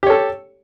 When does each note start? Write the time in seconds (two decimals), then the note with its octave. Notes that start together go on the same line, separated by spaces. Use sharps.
0.03 G4
0.06 C#5
0.10 A4